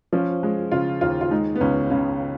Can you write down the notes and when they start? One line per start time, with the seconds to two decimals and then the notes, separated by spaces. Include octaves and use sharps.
0.13 F3 C#4
0.43 G#3
0.72 C#3 F4
1.01 D#2 F4
1.21 F4
1.31 G#3 D#4
1.56 B3
1.61 C#2 C#4
1.90 C#3 C#4